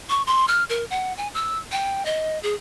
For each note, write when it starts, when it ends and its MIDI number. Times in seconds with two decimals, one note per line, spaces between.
0.09 0.23 85
0.27 0.46 84
0.48 0.64 89
0.69 0.85 70
0.90 1.13 78
1.17 1.28 80
1.34 1.59 88
1.72 2.03 79
2.05 2.39 75
2.43 2.54 68